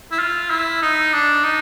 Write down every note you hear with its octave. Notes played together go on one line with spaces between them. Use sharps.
E4
F4
E4
D#4
D4
D#4